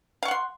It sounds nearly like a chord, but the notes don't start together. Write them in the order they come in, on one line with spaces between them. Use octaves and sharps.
F5 C#6 F#5 C6